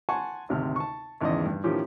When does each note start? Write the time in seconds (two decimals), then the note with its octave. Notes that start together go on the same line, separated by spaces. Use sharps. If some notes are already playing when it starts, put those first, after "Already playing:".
0.09 F#5 G#5 A5 C6 C#6
0.49 G#1 D2 C3 F6
0.76 A5 C#6
1.21 G#1 E2 C#3 D5 D#5
1.45 G2
1.64 A2 D#3 F3 C#4 G4